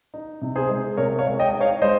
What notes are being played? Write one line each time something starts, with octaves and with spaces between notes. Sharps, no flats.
D#4
C3
G#4 C5
G#3
C3 A#4 C#5
C#5 F5
G#3
D#5 G5
D#4
C#5 F5
G#3 C5 D#5